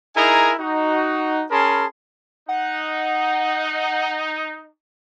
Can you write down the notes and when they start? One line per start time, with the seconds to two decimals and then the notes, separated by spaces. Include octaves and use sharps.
0.16 D#4 E4 G#4 A#4 G#5 A#5
0.59 D#4 F#4
1.51 C#4 G#4 A#4 A5 B5 C6
2.49 D#4 F#5